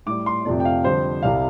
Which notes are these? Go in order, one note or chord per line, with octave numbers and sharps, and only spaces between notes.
A2 G3 D6
C6
F2 C3 F3 A3 D5
G5
F5
F2 D3 G3 C5
C2 C3 G3 F5